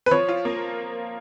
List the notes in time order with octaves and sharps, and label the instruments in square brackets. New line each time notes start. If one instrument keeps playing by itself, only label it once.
[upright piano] B4
[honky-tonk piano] F3 [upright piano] C#5
[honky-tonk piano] F4
A#3